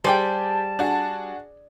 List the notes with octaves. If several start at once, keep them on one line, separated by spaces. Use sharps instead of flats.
G3 G4 G#4 C5 D5 G5 A5
D4 F#4 G#4